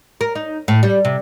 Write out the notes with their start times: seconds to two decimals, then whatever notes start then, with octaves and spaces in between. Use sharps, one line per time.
0.21 A#4
0.35 D#4
0.68 A2
0.83 G3
1.05 C3